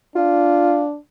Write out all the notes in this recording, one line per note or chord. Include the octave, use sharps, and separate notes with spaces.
D4 F4